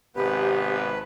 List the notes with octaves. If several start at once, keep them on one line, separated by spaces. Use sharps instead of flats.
G#1 C3 B3 G4 B4